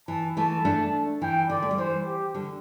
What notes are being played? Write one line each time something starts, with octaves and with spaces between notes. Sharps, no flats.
E3 A5
E3 A3 A5
A3 D4
E3 G5
D3 D5
A3
G3
E3 C5
G4
D3 G3